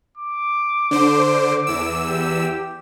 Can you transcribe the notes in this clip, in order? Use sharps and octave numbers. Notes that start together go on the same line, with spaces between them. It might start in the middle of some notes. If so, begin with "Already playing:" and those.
D6
D3 C5
E2 E6
G4